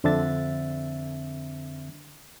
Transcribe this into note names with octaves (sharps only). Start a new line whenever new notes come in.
F2 D3 C4 D4 E5 A6